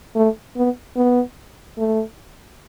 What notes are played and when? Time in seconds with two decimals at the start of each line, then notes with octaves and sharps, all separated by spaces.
0.16 A3
0.57 B3
0.96 B3
1.78 A3